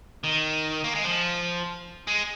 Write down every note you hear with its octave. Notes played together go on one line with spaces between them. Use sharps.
D#3
A#3
G#3
F3
G#3